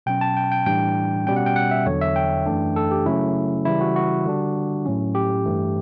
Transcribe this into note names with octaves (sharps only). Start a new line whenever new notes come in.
B2 F#3 C#4 G5
A5
G5
G5
A2 E3 G3 D4 G5
B2 G3 C#4 G5
F#5
G5
F#5
E5
E2 D3 F#3 C#5
E5
G5
F#2 E3 A3 D4
A4
G4
C#3 F#3 A3 C#4 E4
C#3 E3 G3 E4
F#4
F#4
D3 G3 D4
A2 F#3 C#4
G4
G2 E3 A3